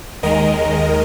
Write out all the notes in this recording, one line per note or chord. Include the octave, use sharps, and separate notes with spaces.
D#2 D#3 G#3 A#4 D#5